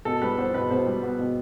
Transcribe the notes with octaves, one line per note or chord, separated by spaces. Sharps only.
B2 A4
G3 B4
B3 C5
B2 B4
B2 C5
G3
B3
B2